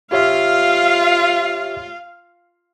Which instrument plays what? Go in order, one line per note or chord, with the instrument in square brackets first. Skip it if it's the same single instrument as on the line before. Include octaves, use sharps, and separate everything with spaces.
[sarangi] F4 [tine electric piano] G4 C#5 E5 [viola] F5